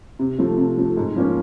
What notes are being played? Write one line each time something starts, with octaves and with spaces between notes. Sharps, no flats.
C3
F3 A3
C3
F3 A3
G#2
F3 A#3 C#4